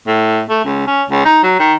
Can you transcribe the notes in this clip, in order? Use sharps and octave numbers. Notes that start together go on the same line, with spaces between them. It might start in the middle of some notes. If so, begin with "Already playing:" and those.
A2
A3
C#2
C#4
C#2
D#4
F#3
D#3